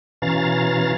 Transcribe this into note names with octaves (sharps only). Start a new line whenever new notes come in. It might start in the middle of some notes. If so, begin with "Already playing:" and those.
B2 E3 C#4 F5 A#5 A6